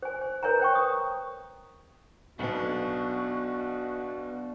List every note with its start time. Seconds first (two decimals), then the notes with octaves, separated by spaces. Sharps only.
0.02 C5 G#5
0.22 C5
0.43 A#4 B4 C#5 E5 G#5 A#5
0.60 C5 G5 C#6
0.75 D#6
2.39 B1 B2 B3 D4 F#4 F#5